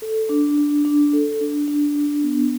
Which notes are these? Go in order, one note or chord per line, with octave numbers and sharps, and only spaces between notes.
A4
D4
D4
D4
A4
D4
D4
D4
B3